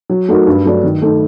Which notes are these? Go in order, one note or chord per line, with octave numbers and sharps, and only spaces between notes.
F#3
A3 D#4 F#4 A#4
G2
F#3 A3 D4
D#3
A3 D#4 A4